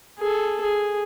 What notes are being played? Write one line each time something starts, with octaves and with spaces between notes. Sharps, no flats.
G#4 A4
G#4